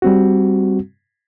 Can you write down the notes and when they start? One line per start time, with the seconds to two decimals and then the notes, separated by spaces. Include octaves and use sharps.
0.02 G3 C4 F#4